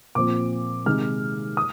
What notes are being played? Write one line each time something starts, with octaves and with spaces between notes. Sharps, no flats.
A#2 F3 C4 D6
C3 D#3 G#3 D#4 F6
D#6